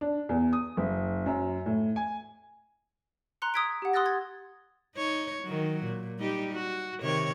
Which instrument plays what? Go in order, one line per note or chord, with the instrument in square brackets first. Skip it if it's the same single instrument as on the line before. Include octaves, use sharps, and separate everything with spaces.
[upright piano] D4
E2
D#6
F#1
F#2
A2
G#5
[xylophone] A#5 C6 F#6 C#7
D#6 E6 G#6 B6 D7
G4 F#5
C6 D#6 E6 F#6 A6 A#6
C6 G#6 A6
[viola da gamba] D#4 C#5
D#3 F#3
A#2
G3 D#4 G4
F#4
C3 D#3 C#5